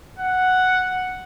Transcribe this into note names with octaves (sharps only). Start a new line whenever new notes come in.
F#5